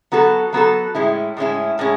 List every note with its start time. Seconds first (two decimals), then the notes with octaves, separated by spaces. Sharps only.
0.12 F#3 B3 F#4 A4
0.53 F#3 B3 F#4 A4
0.95 A2 G#3 C#4 E4
1.37 A2 G#3 C#4 E4
1.79 A2 G#3 C#4